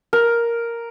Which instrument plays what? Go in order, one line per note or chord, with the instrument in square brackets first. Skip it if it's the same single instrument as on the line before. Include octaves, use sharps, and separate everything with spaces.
[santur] A#4